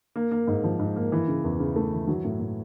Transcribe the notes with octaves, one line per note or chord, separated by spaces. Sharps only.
A#3
A#3
G#2
F3
G#2
A#3
E3
C#3
E2
C#3
A3
E3
F#3
A2
A2